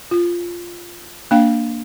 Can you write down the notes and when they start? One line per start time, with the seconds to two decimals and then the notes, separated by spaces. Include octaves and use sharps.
0.11 F4
1.31 A#3 D4 F5 G5